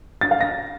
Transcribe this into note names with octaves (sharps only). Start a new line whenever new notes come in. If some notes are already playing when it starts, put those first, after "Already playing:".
A6
F5
A#6